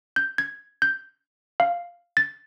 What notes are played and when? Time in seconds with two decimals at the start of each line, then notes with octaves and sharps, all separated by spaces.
0.16 G6
0.38 G#6
0.82 G6
1.60 F5
2.17 A6